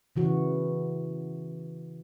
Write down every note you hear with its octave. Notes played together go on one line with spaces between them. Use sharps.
C#3 E3 F#4